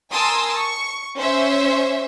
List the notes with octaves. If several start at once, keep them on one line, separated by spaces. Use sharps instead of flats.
A#4 G#5 A5 C6 D#6 E6
C#6
C#4 C5 E5